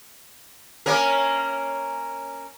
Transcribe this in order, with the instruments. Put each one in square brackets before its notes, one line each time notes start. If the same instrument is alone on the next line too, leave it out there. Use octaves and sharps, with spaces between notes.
[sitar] A#3 C#4 A#4